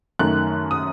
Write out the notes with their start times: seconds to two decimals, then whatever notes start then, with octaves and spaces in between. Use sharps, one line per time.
0.19 F#2 D#3 A3 F#6
0.71 D#6